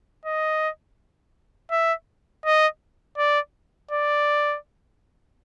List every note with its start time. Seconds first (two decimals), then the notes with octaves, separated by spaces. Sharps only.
0.26 D#5
1.71 E5
2.45 D#5
3.18 D5
3.91 D5